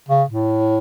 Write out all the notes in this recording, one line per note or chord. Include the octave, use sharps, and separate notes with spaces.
C#3
A2